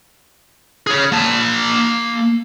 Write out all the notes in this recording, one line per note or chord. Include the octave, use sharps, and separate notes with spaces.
G#4 C#5
A#3 A5